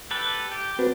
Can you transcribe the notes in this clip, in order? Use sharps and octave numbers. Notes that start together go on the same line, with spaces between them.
G4 A4 B4
G4
C4 D4 F#4 B4